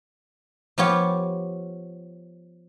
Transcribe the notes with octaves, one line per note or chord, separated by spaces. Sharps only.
F3 B3 F4 G4 C#5